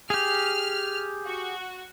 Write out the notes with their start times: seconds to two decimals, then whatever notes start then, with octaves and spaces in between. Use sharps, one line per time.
0.10 G4 G#4 F6
1.25 F#4